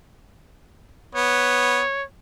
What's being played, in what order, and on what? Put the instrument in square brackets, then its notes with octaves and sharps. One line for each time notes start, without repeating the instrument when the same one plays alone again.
[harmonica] B3 [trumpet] C#5